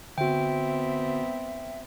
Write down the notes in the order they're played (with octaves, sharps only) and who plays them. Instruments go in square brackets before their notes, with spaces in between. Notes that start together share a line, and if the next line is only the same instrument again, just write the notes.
[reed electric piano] D3 F#4 [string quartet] B3 C4 [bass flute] E5 [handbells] G5